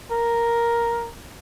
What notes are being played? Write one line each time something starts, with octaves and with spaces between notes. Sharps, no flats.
A#4